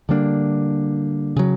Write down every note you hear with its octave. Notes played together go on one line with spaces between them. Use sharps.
D3 G3 A#3 D4
C#3 F#3